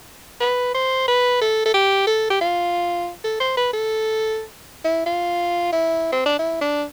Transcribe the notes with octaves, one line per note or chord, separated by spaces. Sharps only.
B4
C5
B4
A4
A4
G4
A4
G4
F4
A4
C5
B4
A4
E4
F4
E4
C4
D4
E4
D4